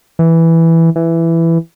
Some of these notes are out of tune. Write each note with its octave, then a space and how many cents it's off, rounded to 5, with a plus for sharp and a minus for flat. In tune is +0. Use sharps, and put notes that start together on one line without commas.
E3 +0
E3 +10